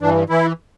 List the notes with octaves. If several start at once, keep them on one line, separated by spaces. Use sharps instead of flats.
G2 E3 D4
E3 E4